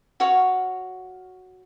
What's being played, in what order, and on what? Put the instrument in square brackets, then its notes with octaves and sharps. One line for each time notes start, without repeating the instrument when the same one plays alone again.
[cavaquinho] F#4 C#5 F5